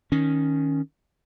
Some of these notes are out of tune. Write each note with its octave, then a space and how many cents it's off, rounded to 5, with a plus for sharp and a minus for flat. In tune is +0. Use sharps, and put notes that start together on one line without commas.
D#3 +0 C#4 +0